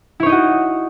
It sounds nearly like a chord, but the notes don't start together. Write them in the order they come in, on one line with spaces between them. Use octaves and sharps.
E4 C#5 D#4 D#5 F#4